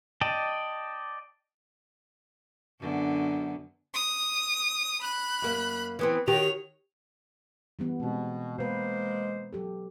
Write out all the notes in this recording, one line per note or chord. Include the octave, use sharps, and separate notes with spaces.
D5 D#5 G5 A5
F#2 D3 B3
D#6
B5 F#6
F#2 A#3
E3 B3 C4
D#3 F#4 G4 C#5 F7
E3 G3 B3
B2 G#3 C4
B2 G#3 A#3 B4 C5
F#3 G4 A4